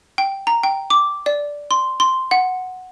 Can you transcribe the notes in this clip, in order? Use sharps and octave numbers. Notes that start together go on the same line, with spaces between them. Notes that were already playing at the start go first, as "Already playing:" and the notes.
G5
A#5
G5
D6
D5
C6
C6
F#5